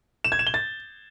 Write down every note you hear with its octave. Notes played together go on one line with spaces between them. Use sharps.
E7
G#6
E7
G7
A6